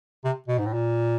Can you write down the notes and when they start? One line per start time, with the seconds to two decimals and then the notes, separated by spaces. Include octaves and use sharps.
0.24 C3
0.48 B2
0.59 G#2
0.66 A2
0.73 A#2